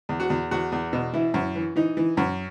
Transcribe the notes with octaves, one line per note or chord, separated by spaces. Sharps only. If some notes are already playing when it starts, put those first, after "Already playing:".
E2
F#4
E2
E2 F#4
E2
B2
E3 E4
F#2
E3
E3 D#4
E3
F#2